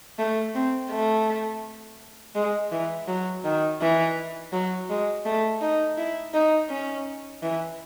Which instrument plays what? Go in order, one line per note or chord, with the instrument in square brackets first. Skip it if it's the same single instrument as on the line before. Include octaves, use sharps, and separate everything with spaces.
[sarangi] A3
C4
A3
G#3
E3
F#3
D#3
E3
F#3
G#3
A3
D#4
E4
D#4
C#4
E3